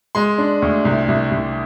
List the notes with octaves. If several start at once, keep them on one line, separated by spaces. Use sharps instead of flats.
G#3 C6
D4
D2
C2
C2
C2